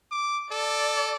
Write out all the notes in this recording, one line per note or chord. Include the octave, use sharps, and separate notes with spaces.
D6
A4 D5